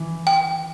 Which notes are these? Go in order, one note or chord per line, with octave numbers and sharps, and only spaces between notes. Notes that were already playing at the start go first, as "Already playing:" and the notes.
Already playing: E3
G5